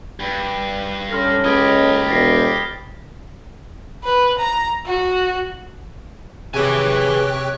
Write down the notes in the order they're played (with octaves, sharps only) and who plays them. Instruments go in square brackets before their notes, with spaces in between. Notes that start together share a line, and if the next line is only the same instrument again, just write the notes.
[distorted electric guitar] G2
[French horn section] C#4 A4 [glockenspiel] C6 F6 A#6
[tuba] C#2 [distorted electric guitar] G4 D#5 [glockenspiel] B5 D#6 G#6
[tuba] E1 [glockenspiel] A6 A#6 C7
[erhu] B4
A#5
F#4
[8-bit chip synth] C3 G4 [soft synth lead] G#4 [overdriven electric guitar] B4 G#5 [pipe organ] C#5 C#6 F#6